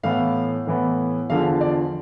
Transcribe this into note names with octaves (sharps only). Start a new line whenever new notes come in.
A2 E3 B3 F5
A2 E3 B3
E2 D3 F3 F5
D5